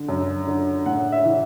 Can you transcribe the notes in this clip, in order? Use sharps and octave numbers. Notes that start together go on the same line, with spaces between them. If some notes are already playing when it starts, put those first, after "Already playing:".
Already playing: D3
F#2
D3
A2 F#5
E5
E3